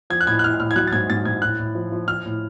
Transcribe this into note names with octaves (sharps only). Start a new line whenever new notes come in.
F3 G#6
F#6
A2 G#6
F#6
A2 F6
A2 F6
G#6
F#3 F#6
A6
G#2 G#6
G#2 A6
G#2 G#6
A2 F#6
A2
F3
F3
F3 F6
A2